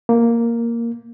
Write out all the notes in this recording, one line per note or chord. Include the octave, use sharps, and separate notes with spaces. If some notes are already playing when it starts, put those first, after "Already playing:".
A#3